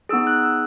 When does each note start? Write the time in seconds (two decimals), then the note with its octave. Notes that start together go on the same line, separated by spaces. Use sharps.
0.09 B3 D#4 G#4 E6
0.27 F#6
0.43 E6